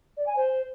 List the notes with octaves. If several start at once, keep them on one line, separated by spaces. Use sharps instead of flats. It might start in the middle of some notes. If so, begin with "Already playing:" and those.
D5
G#5
C5